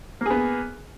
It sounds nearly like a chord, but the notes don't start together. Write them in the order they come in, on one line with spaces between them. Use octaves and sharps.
A#3 G#4 B3